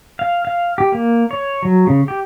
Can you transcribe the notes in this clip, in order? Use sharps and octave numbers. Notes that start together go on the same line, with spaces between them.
F5
F5
G4
A#3
C#5
F#3
C#3
G4